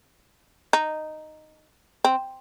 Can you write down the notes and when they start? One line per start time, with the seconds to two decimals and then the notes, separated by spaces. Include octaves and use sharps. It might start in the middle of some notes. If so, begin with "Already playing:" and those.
0.73 D#4
2.04 C4